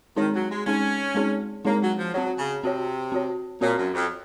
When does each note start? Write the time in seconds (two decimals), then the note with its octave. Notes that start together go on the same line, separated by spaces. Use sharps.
0.16 D#3 G#3 C4 D#4 G#4 C#5
0.34 F#3
0.50 G#3
0.66 G#3 C4 C#4 D#4 G#4 C#5
1.15 G#3 C4 D#4 G#4 C#5
1.65 G#3 A#3 C4 D#4 G#4 C#5
1.81 F#3
1.97 F3
2.13 F#3 C4 F#4 C#5
2.38 C#3
2.62 C3 C4 F#4 C#5
3.12 C4 F#4 C#5
3.61 A#2 C4 F#4 C#5
3.78 F#2
3.94 F2